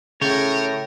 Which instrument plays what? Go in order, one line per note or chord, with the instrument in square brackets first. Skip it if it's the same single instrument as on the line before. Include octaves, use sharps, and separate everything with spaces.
[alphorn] A2 [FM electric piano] C#3 G6 A6 [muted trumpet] A#4 [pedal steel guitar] C#5